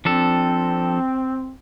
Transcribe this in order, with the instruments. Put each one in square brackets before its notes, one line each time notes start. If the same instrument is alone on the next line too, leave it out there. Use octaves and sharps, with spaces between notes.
[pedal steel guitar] F3 D4 A4 [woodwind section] C4